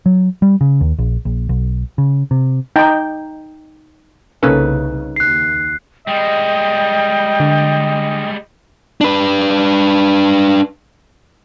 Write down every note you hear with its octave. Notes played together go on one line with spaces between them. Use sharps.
F#3
G3
C#3
D#2
A#1
A#1
B1
C#3
C3
D#4 G5
C2 C#3 A#3 C#4 D#4 A4 B4
D#2 F#6 C7
G3 G#3 D#5 G5
D3
D4 B4